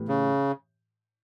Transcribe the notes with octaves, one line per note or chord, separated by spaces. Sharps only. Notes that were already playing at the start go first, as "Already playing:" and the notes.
Already playing: A2 E3 B3 G4
C#3